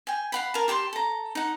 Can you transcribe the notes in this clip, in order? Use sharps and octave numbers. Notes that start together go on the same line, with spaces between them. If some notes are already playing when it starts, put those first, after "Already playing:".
G5 G#5
F5 F#5 B5
A#4 A5
G4 A5 A#5 C6
A4 A#5
D#4 F#5